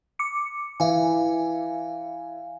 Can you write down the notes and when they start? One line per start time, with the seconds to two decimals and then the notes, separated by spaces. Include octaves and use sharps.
0.19 D6 C#7
0.80 E3 E4 E5 F5 G#5